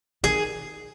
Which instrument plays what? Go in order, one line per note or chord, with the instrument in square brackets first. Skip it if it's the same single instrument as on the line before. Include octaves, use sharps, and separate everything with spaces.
[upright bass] D#3 [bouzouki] G#4